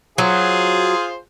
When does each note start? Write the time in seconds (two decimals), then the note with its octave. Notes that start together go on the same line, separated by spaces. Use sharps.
0.18 F#3 F4 G#4 C5